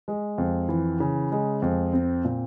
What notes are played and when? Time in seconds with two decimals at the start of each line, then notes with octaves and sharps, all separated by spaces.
0.08 G#3
0.38 F2
0.69 E3
1.00 C#3
1.32 G#3
1.62 F2
1.93 C4
2.25 A#2